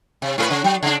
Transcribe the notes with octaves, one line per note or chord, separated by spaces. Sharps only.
C3
A2 G#4 B4
C#3
F#3
C#3 D4